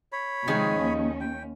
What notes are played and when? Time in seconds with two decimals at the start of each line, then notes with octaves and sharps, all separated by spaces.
0.12 C#5 B5
0.48 C3 D#3 F3 G#3 D#4 G#4
0.82 D#2 C#4
1.21 G5